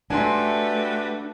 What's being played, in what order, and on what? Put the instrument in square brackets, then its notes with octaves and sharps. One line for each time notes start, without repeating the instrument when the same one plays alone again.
[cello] A3 [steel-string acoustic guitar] D4 [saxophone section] F#4 G4 B4 [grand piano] G#5 C6